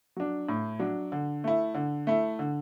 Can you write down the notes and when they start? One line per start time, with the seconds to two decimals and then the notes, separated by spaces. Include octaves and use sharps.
0.16 F#3 D4
0.49 A2
0.79 F#3 D4
1.12 D3
1.44 A3 E4
1.74 D3
2.07 A3 E4
2.39 D3